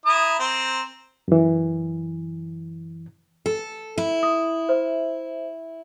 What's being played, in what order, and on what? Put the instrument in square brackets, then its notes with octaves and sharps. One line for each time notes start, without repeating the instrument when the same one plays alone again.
[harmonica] E4 A#5 D#6
C4 A#4
[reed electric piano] F#2 E3
[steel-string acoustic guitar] A4
E4
[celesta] D#6
C5 E5